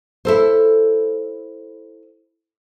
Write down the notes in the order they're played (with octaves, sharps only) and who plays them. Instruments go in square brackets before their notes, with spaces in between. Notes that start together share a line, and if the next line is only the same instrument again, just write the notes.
[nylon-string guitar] E4 A4 C5